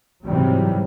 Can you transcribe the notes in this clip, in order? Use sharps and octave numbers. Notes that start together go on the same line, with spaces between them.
G#2 C3 E3 F#3 G3